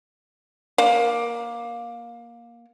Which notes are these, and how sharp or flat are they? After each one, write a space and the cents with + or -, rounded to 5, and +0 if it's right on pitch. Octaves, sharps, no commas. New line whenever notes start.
A#3 +15